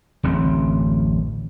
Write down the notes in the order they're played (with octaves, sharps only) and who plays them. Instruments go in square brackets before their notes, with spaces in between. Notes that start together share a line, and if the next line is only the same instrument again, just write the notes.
[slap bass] D1 A1 F#2 C4